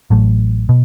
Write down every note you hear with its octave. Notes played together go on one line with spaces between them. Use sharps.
A1 A2 F#3 A3
B2